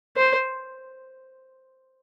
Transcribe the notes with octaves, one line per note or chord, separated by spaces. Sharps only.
C5